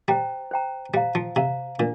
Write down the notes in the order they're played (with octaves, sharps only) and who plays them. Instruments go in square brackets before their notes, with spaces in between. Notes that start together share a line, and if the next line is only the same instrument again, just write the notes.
[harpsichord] G3 [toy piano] C5 G5 A#5
[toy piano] C5 G5 A#5
[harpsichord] G3 [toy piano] C5 F5 A#5
[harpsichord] F3
[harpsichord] C3 [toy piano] C5 F5 A#5
[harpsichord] A#2 [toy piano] D4